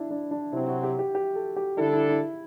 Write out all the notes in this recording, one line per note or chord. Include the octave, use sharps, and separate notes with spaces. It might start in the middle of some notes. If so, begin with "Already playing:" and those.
Already playing: D4 E4
D4
D4
C3 F#3 C4 E4
F#4
G4
G4
G4
A4
G4
D3 G3 D4 E4 A4
E4
E4